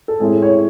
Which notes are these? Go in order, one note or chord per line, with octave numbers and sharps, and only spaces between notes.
A4
A2 G#3 C4 E4 G#4
C#5